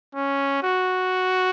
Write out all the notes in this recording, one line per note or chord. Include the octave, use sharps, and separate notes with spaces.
C#4
F#4